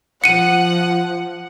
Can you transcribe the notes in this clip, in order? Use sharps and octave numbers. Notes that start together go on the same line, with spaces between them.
F3 F#5 C#7 D#7